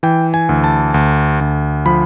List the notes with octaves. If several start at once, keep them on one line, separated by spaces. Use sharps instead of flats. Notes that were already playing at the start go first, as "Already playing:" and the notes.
E3 G5
G#5
D2
A5
D2
D2
F3 B5